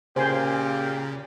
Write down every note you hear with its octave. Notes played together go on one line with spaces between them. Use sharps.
A#2 C#3 G4 C5 G#5 C6